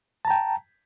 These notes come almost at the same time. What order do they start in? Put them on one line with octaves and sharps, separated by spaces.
A5 A#5 G5